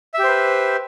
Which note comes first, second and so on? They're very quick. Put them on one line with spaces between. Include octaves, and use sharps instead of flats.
E5 G4 C5 B4